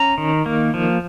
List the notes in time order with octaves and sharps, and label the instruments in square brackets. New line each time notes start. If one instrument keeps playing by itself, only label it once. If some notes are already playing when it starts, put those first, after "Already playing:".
Already playing: [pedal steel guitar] C#4 A#5
D#3
A#3
F3